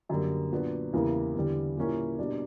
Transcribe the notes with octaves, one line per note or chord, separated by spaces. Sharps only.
F#2 D3 G3 A#3
A#2 F#3 B3 D4
E2 C#3 G3 A#3 E4
E2 D3 G3
A#2 G3 A#3 C#4 E4
B2 G3 A#3 D4